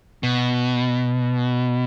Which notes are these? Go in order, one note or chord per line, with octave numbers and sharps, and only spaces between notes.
B2